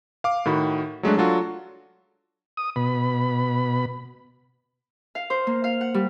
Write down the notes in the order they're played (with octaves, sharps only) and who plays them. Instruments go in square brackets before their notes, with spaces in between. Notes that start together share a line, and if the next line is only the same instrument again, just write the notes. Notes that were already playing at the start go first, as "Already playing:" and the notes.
[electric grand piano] F5 D6
A2 D#3 F#4 B5
F#3 G#3 A3 D4
F#3 D4 F4 F#4 A4
[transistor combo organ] D#6
B2 B5
[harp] F5
C5
A#3
F5
F#5
G3